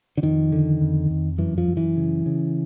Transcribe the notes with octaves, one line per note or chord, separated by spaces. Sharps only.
D3
F2 D#3
D3
F2
F2
F#2 E3
F3
F#2
E3
C#3
C#3